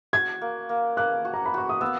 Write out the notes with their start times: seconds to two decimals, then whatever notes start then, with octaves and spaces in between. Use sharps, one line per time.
0.13 F#4 G#6
0.41 A#3
0.69 A#3
0.97 A#3 F#6
1.25 F#4
1.34 A#5
1.46 B5
1.54 F#4 C#6
1.69 D#6
1.81 B3 E6